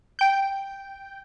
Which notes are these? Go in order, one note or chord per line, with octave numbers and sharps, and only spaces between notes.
G5 G6